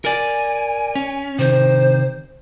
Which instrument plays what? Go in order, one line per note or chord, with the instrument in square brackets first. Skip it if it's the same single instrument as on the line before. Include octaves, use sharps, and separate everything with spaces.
[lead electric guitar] A#4 D5 [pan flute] G#5
[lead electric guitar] C#4
[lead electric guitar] C3 D#3 [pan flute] C5